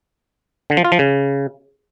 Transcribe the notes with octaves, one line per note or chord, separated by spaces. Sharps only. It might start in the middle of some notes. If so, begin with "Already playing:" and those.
D3
F3
F4
F3
C#3